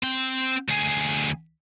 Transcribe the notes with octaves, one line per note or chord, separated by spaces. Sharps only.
C4 G5
D2 G#4